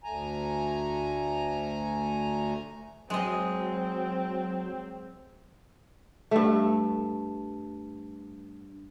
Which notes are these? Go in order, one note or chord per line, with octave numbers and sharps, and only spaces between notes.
D2 A3 G#5 A#5
F#3 G#3 C4 D#5
G2 A3